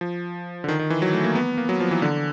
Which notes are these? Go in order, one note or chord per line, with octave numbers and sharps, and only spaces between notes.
F3
D3
D#3
D#3
E3
F#3
A3
A#3
B3
A#3
F#3
F3
E3
D3